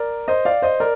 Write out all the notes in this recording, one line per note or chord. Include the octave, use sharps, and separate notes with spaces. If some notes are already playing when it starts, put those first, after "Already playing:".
Already playing: A#4 D5
C5 D#5
D5 F5
C5 D#5
A#4 D5